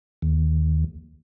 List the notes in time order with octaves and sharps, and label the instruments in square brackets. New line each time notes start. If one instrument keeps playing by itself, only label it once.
[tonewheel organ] D#2